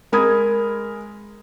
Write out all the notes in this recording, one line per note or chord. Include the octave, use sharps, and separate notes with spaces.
G#3 A#4 B5 D#6 G#6